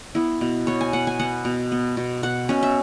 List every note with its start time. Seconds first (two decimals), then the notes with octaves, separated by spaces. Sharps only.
0.15 B3 E4
0.41 B2
0.67 B3 C#5
0.81 G#5
0.93 B2 F#5
1.07 G#5
1.19 B3 F#5
1.45 B2
1.72 B3
1.97 B2
2.23 B2 F#5
2.49 B2 C#4
2.63 E5